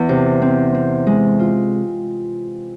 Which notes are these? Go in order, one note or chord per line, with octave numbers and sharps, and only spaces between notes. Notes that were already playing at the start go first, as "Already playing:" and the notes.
Already playing: E2
C3
C4
C4
G#3
F4